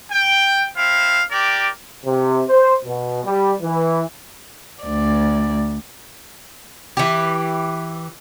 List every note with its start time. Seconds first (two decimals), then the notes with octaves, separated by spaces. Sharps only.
0.12 G5
0.76 C4 E4 F5
1.31 G4 A#4 D5
2.06 C3
2.49 C5
2.86 B2
3.25 G3
3.62 E3
4.84 D2 D5
6.97 E3 G4